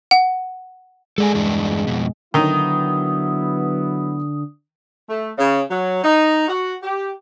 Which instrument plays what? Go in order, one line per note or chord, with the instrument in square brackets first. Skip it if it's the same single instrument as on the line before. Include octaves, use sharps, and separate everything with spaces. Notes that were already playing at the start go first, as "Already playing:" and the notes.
[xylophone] F#5
[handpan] G#3 [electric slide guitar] A4 D5 G#5
[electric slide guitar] E2 G2 D4
F2 B2
[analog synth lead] D3 [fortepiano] D#3 D#4 [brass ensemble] F#3 B3 E4 [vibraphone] D#6
[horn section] A3
C#3
F#3
D#4
F#4
G4